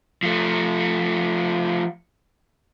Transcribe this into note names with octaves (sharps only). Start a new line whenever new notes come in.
F3 A3